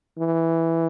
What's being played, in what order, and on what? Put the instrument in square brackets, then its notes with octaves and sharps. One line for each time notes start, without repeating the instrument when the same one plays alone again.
[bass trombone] E3